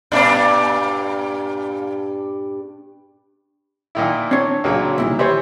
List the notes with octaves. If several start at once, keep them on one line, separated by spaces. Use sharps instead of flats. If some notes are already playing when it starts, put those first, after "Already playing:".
G2 A#2 D4
A#2 D#3 E4
C4 D4 C#5
C#2 A#2 F#3
C2 A#2 D#3 E4
E3 G4 C5 C#5 E5 B5